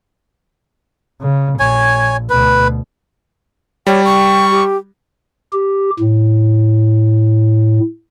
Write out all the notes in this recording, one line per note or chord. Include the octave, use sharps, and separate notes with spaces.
C#3
A#1 C#5 G#5
D2 B2 B4
G3 C#5 G5
C#6
G4
G4
A2